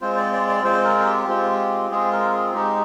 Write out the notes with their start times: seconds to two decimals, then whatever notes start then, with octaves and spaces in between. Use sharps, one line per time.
0.01 G#3 C4 F4 C5
0.17 D5
0.33 D5
0.49 D5
0.64 G#3 C4 F4 C5
0.85 A#4
1.06 G4
1.28 G#3 C4 F4
1.91 G#3 C4 F4 G#4
2.12 A#4
2.32 G#4
2.53 G#3 D#4 G4